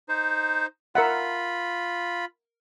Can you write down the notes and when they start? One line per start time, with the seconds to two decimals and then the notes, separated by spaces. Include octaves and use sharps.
0.08 D#4 C5
0.95 F4 A#4 E5 F#5 B5